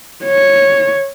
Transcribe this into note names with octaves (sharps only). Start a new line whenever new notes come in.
C#5